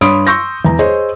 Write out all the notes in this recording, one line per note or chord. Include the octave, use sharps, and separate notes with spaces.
G2 C#5 B5 C6 D#6 D7
C6 C#6 E6 G6 A#6
E2 A#5
G#4 C5 C#5 D#5 C6